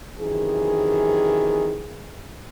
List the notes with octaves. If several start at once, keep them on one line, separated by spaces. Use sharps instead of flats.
F#2 C3 D#3 E3 G#4